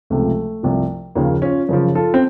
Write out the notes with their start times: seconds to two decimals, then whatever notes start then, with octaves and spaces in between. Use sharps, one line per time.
0.10 C#2 C3 F3 A3
0.63 C2 C3 F3
1.15 D#2 C#3 F3 A#3
1.42 C#4 F4
1.69 F#2 C#3 F3
1.95 F4 A4
2.14 C4